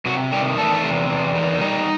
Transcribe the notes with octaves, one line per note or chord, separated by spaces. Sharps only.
C3 F#3 F#4
D#3 G3 G4
E2 A3 A4
C3
E2
D#3
G3 D#4 D#5